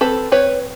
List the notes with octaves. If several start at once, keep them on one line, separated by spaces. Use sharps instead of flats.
C4 A4 B4
C4 B4 C#5